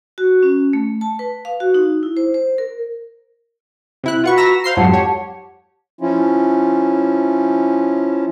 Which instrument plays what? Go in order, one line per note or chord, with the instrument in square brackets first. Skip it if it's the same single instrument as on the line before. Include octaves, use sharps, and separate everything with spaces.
[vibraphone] F#4
C#4
A3
A5
B4
F5
F#4
D#4
E4
C5
C5
A#4
[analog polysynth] C3 E4 F#6
[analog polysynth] F4 F#5 C#6 [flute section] F#4 B4
[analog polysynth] A#5 E6 A#6
[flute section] C5 [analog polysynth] F5 C6 C7
[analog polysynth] F2 G#2 F#3 [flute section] G4 F#5 A5
[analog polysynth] C#5
[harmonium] F3 C#4 E4 F4